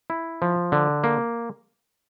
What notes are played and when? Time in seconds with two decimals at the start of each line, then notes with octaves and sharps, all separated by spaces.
0.10 E4
0.42 F3
0.72 D3
1.04 A#3